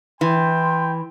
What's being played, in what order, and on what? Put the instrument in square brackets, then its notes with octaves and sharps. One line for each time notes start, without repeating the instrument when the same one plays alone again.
[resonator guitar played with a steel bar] E3 [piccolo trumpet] G5 [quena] C6